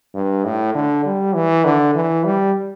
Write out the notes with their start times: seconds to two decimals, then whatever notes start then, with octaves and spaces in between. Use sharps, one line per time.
0.14 G2
0.45 A2
0.74 D3
1.05 G3
1.35 E3
1.65 D3
1.95 E3
2.25 G3